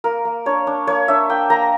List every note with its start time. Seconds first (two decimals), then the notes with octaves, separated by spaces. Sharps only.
0.04 A#3 A#4
0.25 A#3
0.46 D4 C#5
0.67 D4
0.87 A#3 C#5
1.08 D4 E5
1.29 A#3 G5
1.50 A#3 A#5